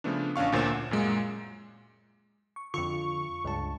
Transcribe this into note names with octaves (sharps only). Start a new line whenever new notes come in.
C#3 F3 A3 B3 D4
A1 C#4 D4 F5 C#6
D2 A#2 C5 C#5 E7
F#5
F#2 A#2 G#3
C#6
F2 D3 F4 C#6
C#2 G2 A5